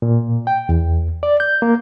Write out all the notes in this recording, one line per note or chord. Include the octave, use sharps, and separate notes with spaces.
A#2
G5
E2
D5
G6
A#3